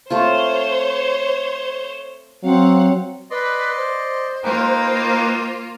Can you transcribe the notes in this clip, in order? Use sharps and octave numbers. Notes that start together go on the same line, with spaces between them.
A3 C4 F4 C5 C#5
F#3 C4 F5 F#5
B4 D5 D#5 C6
C5
A#3 D#4 F4 B4 G5